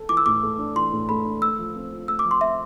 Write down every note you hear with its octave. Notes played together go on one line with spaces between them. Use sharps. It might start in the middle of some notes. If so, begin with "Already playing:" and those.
Already playing: A4
E3 D6
E6
A2 D6
A3
D4
E3 C6
A2
A3 B5
D4
A3 E6
F3
C4
F4
A3 E6
D6
F3
C6
C4 E5